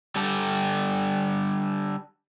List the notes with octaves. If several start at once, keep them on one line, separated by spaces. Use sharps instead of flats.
D3 G3 G4 A4